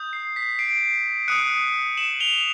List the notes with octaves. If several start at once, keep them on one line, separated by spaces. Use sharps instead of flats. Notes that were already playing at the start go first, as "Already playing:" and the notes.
Already playing: D#6 G6
C7
B6
C7 D7
D#6 F#6 C#7 D#7
E7 F#7
F7 G7